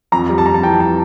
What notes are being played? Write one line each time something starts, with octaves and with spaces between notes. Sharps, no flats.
F2 A#5
G3
A5
F2 A#5
A5
E3 G5
A5